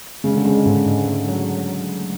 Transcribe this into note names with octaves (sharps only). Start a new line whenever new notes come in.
C#3 G#3
D3
C#3 G#3
G#2 D3
G#2
A3
F#3